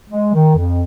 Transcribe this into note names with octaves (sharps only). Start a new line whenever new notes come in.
G#3
D#3
F2